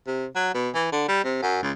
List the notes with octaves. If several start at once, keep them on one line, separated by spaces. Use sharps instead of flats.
C3
F#3
B2
E3
D3
G3
C3
F#2
C#2